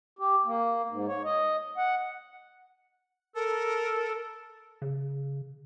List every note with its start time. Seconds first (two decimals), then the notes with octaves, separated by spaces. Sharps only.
0.19 G4
0.45 A#3
0.89 G#2
1.08 C#5
1.25 D#5
1.77 F#5
3.35 A4 A#4
4.82 C#3